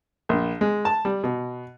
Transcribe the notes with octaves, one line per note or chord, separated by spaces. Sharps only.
A#1
G#3
A5
G3
B2